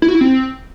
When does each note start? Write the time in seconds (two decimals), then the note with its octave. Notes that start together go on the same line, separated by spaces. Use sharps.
0.02 E4
0.08 F#4
0.15 E4
0.21 C4